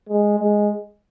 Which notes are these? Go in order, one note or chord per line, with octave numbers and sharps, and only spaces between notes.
G#3
G#3